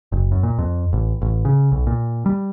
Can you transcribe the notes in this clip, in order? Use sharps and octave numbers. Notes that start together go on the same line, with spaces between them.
F#1
F#2
A#2
F2
A1
A1
C#3
B1
A#2
G3